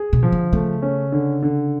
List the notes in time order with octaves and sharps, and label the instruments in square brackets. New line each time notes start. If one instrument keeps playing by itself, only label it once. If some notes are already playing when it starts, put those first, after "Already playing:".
Already playing: [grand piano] G#4
[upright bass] B2
[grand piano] F3
[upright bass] D3
[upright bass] C#3 [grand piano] A3
[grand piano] C#4
D3
D3